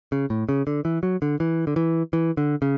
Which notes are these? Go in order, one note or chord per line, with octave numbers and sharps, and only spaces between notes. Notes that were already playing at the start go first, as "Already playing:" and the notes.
C#3
A2
C#3
D3
E3
F#3
D3
E3
D3
E3
E3
D3
C#3